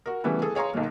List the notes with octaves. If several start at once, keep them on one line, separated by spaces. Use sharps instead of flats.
F#4 A#4
C#3 E3 G3 A3 B3
G#4 A4
G#4 C#5 F5 A#5 C6
B1 D#3 F#3 A#3